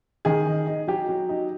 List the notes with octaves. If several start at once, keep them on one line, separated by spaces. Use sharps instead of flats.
D#3 G#4
D#4
D#4
F#3 G4
F#3
D#4